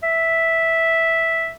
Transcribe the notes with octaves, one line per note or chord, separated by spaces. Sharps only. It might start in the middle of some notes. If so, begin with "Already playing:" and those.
E5